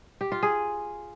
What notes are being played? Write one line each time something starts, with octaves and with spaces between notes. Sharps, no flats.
G4
F4
G#4